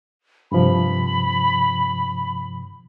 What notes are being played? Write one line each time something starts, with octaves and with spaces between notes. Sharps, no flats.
G2 C3 F3 B5